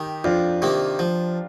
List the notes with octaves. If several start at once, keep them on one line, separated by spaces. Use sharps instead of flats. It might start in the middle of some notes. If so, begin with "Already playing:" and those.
Already playing: D#3 D#4 G4
F2 D4 F4
C3 D#3 A#3
F3